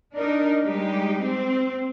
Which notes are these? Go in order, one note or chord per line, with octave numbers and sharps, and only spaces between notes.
D4 D#4 A#4
G3 G#3 D#4 G4
C4